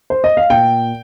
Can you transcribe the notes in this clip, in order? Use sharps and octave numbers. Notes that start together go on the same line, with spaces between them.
C5
D#5
F5
A#2 G5